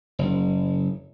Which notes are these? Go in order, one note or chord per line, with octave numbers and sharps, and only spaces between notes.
F#1